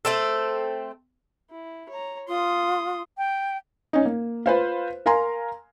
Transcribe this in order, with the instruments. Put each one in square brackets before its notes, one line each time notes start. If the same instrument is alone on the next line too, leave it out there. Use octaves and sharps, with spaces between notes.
[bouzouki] A3 C4 A4
[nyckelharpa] E4
C#5 A#5
[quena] F4 [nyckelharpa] C6 D#6
[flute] G5
[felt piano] C#4 D#4
A#3
F4 B4 C5 F5
A#4 F5 G#5 A#5 C6